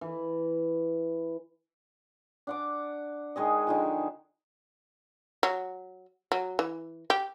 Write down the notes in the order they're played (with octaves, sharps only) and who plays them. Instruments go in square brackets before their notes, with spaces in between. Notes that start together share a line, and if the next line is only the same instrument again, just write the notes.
[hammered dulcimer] E3
D4 F#5 D6
D#3 G#3 G#4 D#5
D3 D#3 F3
[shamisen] F#3
F#3
E3
G4